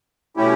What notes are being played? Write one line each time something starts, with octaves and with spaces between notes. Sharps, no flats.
B2 A3 C#4 E4 G4